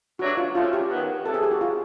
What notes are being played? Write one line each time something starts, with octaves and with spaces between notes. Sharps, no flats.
G2 D3 F#3 A3 D4 F#4
F4
F3 A3 C#4 F4
G4
D#3 F#3 B3
C3 E3 A3 A4
G#4
G4
F#4
F4